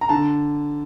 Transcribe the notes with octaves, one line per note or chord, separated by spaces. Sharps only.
A#5
D3 A5